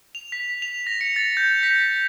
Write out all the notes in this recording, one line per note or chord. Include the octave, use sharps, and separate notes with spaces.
F7
B6
F7
A#6
C#7
A6
G6
B6